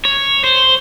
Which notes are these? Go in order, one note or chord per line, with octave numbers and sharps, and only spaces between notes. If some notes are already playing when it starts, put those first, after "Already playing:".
C#5
C5